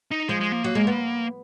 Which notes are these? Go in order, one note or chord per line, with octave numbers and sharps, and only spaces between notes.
D#4
F3 G#3
G#3
A#3
F#3
G#3
B3